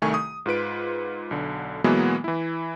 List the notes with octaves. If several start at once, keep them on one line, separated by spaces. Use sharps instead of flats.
C2 D#3 A3 G#5 C#6
D#6
G#2 F4 B4 D7
B1 D3
B2 E3 F#3 G#3 A#3 B3
E3 E4